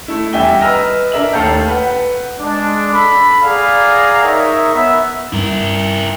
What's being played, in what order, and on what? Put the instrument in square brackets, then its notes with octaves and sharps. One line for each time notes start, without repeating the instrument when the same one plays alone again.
[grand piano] A3 E4
E2 G3 E5 G5 G#5 G7
B4 D#5 A#5 E6 F6 A#6
D4 A#4 E5 F#7
D#2 A3 A4 F5 A#5 G6
B4 F#5
[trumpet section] G#3 D4
A4 B5
G#4 D5 F5 F#5 A#5
D#4 A#4 C#5 D#5 E5
B3 E5
[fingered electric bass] G2 [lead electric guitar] E4 A#4